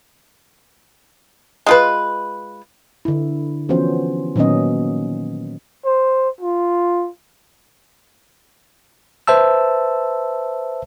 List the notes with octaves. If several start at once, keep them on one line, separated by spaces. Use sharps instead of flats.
G#3 F4 B4
D3 E4
E3 F3 B3 C#4 F#4 C5
A#2 D#3 F#3 B3 C#4 D#5
C5
F4
B4 C5 E5 A5 E6